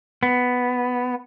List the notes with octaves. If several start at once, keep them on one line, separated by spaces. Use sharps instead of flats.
B3